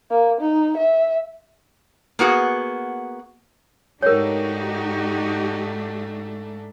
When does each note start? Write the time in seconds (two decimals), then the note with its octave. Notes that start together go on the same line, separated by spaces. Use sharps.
0.11 A#3
0.41 D#4
0.77 E5
2.19 A#3 B3 F#4 G#4
4.03 G#2 A3 D4 D#4 F#4 G4 A#4 C#5